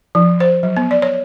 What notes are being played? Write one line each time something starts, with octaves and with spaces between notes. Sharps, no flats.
F3
C5
F#3
B3
D5
C#5